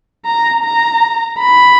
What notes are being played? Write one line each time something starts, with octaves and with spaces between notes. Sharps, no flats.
A#5
A#5
B5